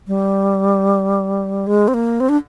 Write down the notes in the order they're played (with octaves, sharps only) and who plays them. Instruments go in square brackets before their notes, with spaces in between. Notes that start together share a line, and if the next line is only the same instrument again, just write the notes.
[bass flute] G3
G#3
C4
A#3
C4
D4